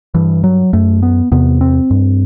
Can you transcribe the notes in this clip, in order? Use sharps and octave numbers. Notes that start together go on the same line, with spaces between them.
G2 E3
F#3
F#2 A3
B3
E2 C3 B3
C4
G2